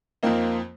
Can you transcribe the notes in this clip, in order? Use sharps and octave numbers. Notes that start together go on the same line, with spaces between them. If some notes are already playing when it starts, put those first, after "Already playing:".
F2 F3 A#3 C4 D#4